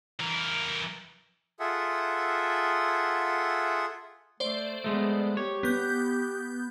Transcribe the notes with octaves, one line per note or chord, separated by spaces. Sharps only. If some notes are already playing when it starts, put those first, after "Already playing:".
E3 A#4
F4 G#4 A4 E5 F#5
A3 C5 D5
G#3 A3 B3
G4 C#5
B3 G6